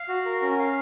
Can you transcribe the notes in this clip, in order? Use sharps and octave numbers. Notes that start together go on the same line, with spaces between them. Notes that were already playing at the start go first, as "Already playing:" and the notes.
Already playing: F5
F#4
A#4
C#4
F5